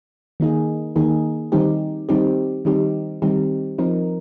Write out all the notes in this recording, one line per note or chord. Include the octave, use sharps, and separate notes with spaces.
D#3 A#3 D#4 G#4
D#3 A#3 D#4 G#4
D#3 G3 C4 D#4 G4
D#3 G3 C4 D#4 G4
D#3 G3 C4 D#4 G4
D#3 G3 C4 D#4 G4
F3 C4 D#4 A#4